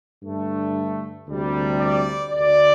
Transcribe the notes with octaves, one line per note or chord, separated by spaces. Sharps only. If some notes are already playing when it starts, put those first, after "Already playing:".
G2 D3 A3
D2 C3 G3
D5
D2 D3 A3 D5